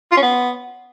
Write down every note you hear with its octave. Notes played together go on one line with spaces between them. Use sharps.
F4
C#4
B3